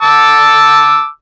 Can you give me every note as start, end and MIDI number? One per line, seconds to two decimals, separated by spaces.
0.02 1.07 81
0.02 1.07 86
0.02 1.07 88